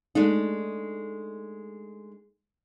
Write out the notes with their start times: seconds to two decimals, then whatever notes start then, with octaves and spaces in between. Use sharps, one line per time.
0.15 G#3 A3 D4 D#4